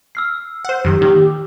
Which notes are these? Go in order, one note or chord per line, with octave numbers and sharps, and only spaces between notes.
E6 F6 C7
C5 F#5
F#2 D#3 G4
A#2 D#3